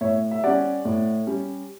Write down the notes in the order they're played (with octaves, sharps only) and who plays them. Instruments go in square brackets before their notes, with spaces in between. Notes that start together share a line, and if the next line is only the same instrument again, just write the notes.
[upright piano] A2 C#5 E5
E5
G3 C#4 D5 F#5
A2
G3 C#4